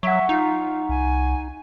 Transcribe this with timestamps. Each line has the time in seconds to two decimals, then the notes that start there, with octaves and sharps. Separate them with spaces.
0.03 F#3 E5 F#5 C#6
0.29 D#4 F4
0.89 C2 G#5